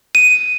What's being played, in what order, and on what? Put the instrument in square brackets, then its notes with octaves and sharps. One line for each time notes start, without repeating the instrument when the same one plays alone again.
[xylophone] D#7